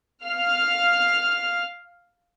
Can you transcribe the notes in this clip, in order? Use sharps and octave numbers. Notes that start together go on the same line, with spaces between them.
F5 F6